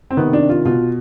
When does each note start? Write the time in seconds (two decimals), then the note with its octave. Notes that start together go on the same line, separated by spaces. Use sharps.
0.11 C4
0.17 C3 D#3 B3
0.33 D4
0.49 F4
0.65 B2 F4